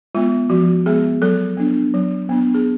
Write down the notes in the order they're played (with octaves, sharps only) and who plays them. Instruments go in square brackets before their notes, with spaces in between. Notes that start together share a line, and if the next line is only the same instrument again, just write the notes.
[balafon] G#3 B3 F4
F3 F#4
G#3 B3 G#4
F#3 A4
B3 D4
F#3
B3 D4
G#4